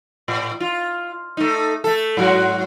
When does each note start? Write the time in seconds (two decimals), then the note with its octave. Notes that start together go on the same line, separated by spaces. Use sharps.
0.28 A2
0.60 F4
1.37 A3 D#4
1.84 A3 A4
2.17 G#2 F#3 F#4